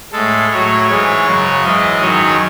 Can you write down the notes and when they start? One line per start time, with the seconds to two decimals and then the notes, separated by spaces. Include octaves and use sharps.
0.12 A2 G#3 A4
0.50 A2 F#3 C#5
0.88 G#2 E3 G#3 C#5
1.25 F#2 C#3 F#3
1.63 G#2 E3 G#3 D#5
2.01 F#2 D#3 F#3 C#5